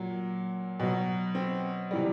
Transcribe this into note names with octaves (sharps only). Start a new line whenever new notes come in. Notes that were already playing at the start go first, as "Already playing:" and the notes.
Already playing: A#2 F#3
B2 F#3
C4
C3 E3 G3